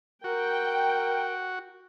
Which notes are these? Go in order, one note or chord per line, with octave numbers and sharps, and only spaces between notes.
F#4 A#4 G5